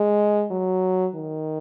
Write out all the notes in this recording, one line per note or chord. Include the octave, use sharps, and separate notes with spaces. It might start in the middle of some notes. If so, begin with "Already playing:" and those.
Already playing: G#3
F#3
D#3